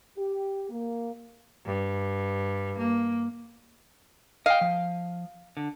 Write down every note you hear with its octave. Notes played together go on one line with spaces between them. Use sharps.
G4
A#3
G2
A#3
D#5 F5 G5
F3
D3